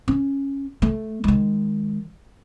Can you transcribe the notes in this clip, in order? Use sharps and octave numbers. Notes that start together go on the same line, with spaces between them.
C#4
A3
D#3 G#3